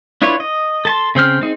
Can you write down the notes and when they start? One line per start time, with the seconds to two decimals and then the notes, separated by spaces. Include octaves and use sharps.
0.22 D4 E4 F4 B4 C#5
0.40 D#5
0.85 A4 A5 C6
1.15 C#3 C4 G5 F6
1.41 C4 D#4 G#4